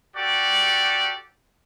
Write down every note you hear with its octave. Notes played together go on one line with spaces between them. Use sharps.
F#4 G4 A4 D5